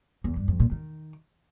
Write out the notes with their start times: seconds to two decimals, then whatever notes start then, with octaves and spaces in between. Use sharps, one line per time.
0.24 E2
0.36 G2
0.48 F2
0.60 A#2
0.71 D#3